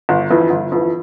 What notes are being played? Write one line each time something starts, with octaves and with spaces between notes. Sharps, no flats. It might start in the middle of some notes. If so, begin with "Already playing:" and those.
G1
F2 E3
G1
F2 E3